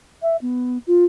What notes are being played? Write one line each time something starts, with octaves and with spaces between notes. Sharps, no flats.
E5
B3
F4